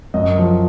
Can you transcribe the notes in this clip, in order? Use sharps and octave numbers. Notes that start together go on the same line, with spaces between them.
F#2 D#5
F3